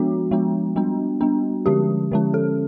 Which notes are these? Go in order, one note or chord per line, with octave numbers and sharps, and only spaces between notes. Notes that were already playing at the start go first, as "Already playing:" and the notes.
Already playing: F3 G#3 B3 D4 F#4
F3 G#3 B3 D4
G3 B3 D4
G3 B3 D4
D3 F3 G#3 C#4 G4
D3 F3 G#3 C#4
A4